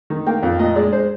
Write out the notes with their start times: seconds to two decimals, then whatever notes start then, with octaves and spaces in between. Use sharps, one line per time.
0.10 D#3
0.26 A#3 G5
0.43 F2
0.59 A#2 D#5
0.76 G#3 D5
0.92 G#3 C5